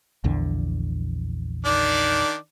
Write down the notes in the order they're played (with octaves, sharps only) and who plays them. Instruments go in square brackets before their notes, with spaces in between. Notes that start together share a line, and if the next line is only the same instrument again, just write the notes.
[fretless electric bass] A#1 E2 D3
[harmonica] D#3 D4 D5